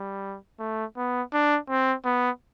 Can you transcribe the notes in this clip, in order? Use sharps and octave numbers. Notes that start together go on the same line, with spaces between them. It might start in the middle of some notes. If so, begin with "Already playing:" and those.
Already playing: G3
A3
B3
D4
C4
B3